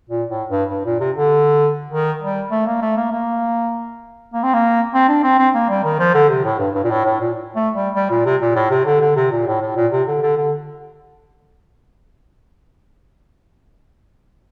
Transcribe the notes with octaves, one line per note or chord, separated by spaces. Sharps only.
A#2
A2
G2
G2
A#2
C3
D3
D#3
G3
A3
A#3
A3
A#3
A#3
A#3
C4
A#3
C4
D4
C4
C4
A#3
G3
D#3
F3
D3
C3
A2
G2
G2
A#2
A2
A2
A#2
A3
G3
G3
A#2
C3
A#2
A2
C3
D3
D3
C3
A#2
A2
A2
A#2
C3
D3
D3
D3